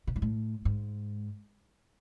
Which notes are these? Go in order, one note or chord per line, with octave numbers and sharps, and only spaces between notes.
B2
G#2
A2
G#2